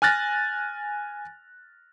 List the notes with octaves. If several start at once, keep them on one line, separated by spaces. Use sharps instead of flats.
G#5 F6 F#6 A6 A#6